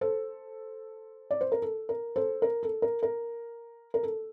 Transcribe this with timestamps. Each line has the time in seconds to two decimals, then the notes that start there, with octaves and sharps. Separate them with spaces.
0.01 A4 C5
1.31 D5
1.41 C5
1.52 A#4
1.62 A4
1.89 A#4
2.16 A4 C5
2.42 A#4
2.63 A4
2.82 A#4
3.03 A#4
3.94 A#4
4.03 A4